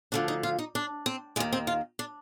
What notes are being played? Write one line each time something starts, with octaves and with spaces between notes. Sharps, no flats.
D2 D3 F3 D4
D#4
F4
D#4
D4
C4
D#2 D#3 G#3
C4
F4
D4